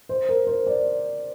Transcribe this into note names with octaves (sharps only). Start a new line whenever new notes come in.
C5
A#4
C5
D5